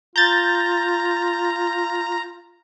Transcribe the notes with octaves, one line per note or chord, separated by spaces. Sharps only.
F4 A#5 G6 A6